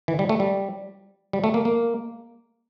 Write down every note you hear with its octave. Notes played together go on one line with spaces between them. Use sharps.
E3
G3
A3
G3
G3
A3
A#3
A#3